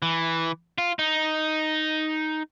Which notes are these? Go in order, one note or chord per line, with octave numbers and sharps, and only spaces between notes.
E3
F4
D#4